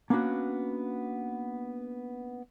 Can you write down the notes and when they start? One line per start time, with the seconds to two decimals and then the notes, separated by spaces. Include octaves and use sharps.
0.10 A#3 B3 C#4 D4 F#4